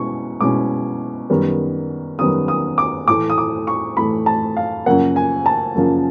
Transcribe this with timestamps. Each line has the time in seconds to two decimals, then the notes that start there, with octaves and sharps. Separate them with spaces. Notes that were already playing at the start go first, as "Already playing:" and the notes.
Already playing: B2 G#3 C#4 E4 C#6
0.41 B2 G#3 C#4 E4 D6
1.30 F#2 D#3 G3 B3
2.19 F#2 D#3 G3 B3 D#6
2.48 D#6
2.78 D6
3.08 A2 E3 A3 D6
3.30 D#6
3.38 D6
3.67 C#6
3.97 A2 E3 A3 B5
4.26 A5
4.57 F5
4.86 F#2 C#3 F3 A#3 F#5
5.16 G#5
5.46 A5
5.75 F#2 C#3 F3 A#3